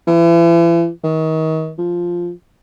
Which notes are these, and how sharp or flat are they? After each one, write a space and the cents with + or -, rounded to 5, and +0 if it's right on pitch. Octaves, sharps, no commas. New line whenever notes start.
E3 +40
D#3 +35
F3 +0